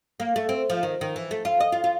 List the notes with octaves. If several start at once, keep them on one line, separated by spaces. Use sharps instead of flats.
A#3
A3
C4
F3
D#3
D#3
E3
A3
F4
D#5
F4
F4